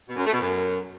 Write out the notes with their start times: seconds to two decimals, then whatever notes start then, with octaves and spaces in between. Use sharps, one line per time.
0.08 B2
0.16 F#2
0.24 A3
0.32 B2
0.40 F#2